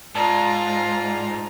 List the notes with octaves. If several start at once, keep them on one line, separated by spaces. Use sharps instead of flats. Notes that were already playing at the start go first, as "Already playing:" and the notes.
G#2 F4 D5 A5 A#5